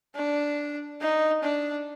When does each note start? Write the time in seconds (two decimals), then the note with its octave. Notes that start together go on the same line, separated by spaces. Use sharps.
0.15 D4
1.01 D#4
1.43 D4